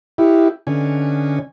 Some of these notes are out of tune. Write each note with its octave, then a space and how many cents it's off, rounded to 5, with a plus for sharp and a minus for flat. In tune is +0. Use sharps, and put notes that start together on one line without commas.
E4 +0 G4 +0
D3 +0 C#4 +0 G#5 -15